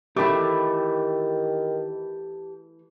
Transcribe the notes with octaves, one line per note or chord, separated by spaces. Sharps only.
D#3 E3 A3 G4 A4 B5 D6